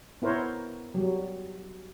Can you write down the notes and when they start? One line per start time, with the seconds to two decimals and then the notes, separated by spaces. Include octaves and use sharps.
0.22 B3 E4 A#4 C5 C#5
0.94 F#3 G3